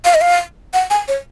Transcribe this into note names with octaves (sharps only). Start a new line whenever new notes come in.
F5
D#5
F5
F#5
G#5
C#5